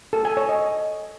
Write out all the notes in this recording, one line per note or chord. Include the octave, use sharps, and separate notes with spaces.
A4
G#5
C#5
D#5